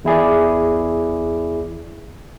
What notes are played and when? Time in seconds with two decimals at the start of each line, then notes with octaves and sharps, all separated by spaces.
0.05 E2 E4 G#4 D5